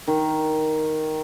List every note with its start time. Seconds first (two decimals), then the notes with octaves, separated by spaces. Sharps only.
0.07 D#3